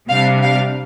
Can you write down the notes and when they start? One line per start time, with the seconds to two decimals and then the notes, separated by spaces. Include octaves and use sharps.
0.09 C3 G3 D4 F5
0.43 F5